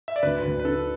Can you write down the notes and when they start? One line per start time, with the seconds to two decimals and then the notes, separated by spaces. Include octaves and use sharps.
0.08 E5
0.16 D5
0.23 D2 B4
0.44 D2
0.60 B4
0.65 D3 A4